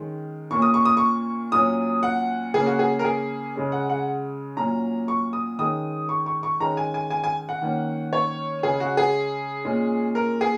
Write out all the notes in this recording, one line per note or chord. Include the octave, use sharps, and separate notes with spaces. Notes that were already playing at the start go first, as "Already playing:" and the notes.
Already playing: D#3 G#3 C#4
A#2 A#3 C#4 C#6
D#6
C#6
D#6
C#6
A#2 F#3 C#4 D#6
F#5
C#3 A#3 C#4 G#4
F#4
G#4
A#4
G#4
C#3 G#3 C#4
F#5
F#5
A#2 F#3 C#4 A#5
C#6
D#6
D#3 G#3 C#4 D#6
C#6
C#6
C#6
D#3 G#3 C#4 A#5
G#5
G#5
G#5
G#5
F#5
D#3 A#3 C#4
C#5
C#3 G#3 C#4 G#4
F#4
G#4
A#2 G#3 C#4
A#4
G#4